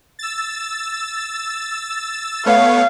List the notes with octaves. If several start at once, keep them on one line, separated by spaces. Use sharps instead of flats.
E6 A6
A3 B3 C#5 F5